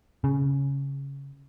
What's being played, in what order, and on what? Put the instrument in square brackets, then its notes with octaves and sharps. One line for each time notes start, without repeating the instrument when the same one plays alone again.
[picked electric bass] C#3